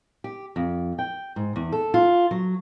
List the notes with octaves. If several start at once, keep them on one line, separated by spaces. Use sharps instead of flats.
G4
F2
G5
G#2
E2
A4
F4
F#3